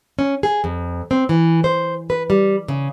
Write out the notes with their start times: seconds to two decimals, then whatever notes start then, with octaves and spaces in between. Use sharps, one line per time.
0.19 C#4
0.43 G#4
0.64 F2
1.11 C4
1.29 E3
1.64 C5
2.10 B4
2.30 G3
2.68 C#3